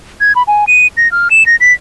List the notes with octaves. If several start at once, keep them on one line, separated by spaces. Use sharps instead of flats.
G#6
B5
G#5
D#7
A#6
F6
E7
A#6
B6